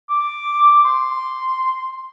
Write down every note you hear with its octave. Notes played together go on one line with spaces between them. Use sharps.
D6
C6